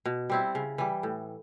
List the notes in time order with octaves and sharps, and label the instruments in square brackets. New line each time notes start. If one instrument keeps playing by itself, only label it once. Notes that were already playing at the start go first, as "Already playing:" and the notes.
[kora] B2
G3 C4 E4
C#3
E3 G3
A2